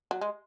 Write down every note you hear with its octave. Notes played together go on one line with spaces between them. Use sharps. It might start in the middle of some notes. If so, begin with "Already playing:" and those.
F#3
G#3